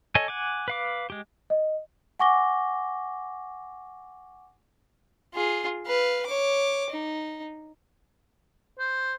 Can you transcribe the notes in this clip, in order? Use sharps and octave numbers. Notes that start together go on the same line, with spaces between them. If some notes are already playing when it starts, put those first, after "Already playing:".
A4 C#5 D#5 G#5
F#5 G#5 D6
B4 F5 D6
G#3 G4
D#5
F#5 G#5 C#6 D6 A#6 G7
F4 G#4
B4 F5
C#5 D6
D#4
C5